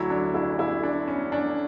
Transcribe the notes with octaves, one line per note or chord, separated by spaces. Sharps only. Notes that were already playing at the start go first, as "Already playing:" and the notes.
Already playing: D2 D3 F#3 E4
D4
E4
E4
D4
C#4
D4